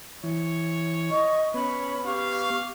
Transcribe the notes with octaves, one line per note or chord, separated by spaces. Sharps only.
E3 C#5
D#5 C#6
B3 C#4 C#5 B5
G4 F5 C#6